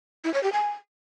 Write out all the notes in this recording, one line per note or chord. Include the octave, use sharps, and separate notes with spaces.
E4
C#5
G4
G#5